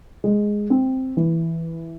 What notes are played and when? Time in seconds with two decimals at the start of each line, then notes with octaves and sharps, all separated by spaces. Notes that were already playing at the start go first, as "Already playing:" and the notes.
0.24 G#3
0.70 C4
1.17 E3